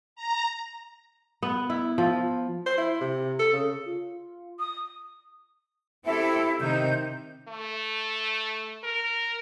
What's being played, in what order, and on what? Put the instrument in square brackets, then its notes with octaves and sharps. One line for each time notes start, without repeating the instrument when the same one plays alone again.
[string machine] A#5
[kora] B3
E4
F3
[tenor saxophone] C5
E4
C3
A4
C#3
[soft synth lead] F4
[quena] D#6
[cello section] C4 G4 A4 [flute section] E4
[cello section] C3 D#3 D#4 [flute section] G6
[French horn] A3
A#4